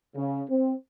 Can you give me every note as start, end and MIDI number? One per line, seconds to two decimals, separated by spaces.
0.16 0.42 49
0.49 0.73 60